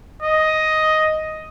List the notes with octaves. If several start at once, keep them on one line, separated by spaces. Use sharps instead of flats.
D#5